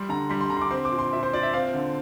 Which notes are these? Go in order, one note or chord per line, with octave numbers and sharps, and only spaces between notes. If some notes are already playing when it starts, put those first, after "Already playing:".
Already playing: G3 C6
D3 A#5
G3 C6
C6
D3 A#5
C6
D6
C4 C6
D6
A#2
C6
A#2 E5
C5
A#2 D5
E5
C4 F5
D3